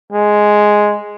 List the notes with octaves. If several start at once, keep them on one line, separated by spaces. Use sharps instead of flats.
G#3